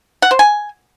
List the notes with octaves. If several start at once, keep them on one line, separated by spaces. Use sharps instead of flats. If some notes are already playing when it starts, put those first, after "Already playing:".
F#5
C5
G#5